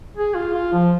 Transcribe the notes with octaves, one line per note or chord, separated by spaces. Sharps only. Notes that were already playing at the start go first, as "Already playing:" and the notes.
G#4
F4
F4
F3